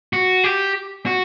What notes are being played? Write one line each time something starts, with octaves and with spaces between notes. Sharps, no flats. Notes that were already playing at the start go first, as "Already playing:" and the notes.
F#4
G4
F#4